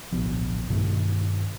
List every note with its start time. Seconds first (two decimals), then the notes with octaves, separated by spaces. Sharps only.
0.12 D1 A#1 B2 F3
0.70 G2 B2 D#3 A3